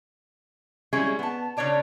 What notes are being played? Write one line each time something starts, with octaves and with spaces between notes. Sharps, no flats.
G3 G#3 C#4 E4 G#4
B3 A5
C#3 D4 C#5 D5 A5